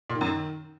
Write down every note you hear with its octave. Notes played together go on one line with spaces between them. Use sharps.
A#2
D#3
F#2
D#3